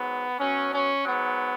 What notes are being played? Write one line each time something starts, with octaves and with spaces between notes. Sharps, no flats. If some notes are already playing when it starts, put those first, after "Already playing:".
Already playing: G#2 F#3 B3
B2 F#3 C#4
C#4
G#2 F#3 B3